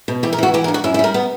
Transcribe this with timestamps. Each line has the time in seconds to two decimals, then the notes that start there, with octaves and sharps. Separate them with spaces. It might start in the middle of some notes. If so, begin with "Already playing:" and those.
0.08 B2
0.23 E3 G4
0.33 A#4
0.38 E3 F#4
0.54 E3 G4
0.64 A#4
0.68 G2
0.74 F#4
0.84 F#2 E4
0.94 E4
0.99 G3 A#4
1.14 B3